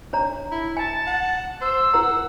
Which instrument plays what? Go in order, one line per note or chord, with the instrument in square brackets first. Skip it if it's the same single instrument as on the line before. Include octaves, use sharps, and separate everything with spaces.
[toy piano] D4 C#5 A#5
[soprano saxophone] E4
[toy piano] G#5 [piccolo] A5
[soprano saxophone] F#5
[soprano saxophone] C5 [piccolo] E6
[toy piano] E4 A#4 A#5 [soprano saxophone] F#5